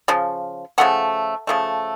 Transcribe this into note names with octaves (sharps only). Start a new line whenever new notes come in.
C#3 F3
C#3 F3 A3 F#5
C#3 F3 A3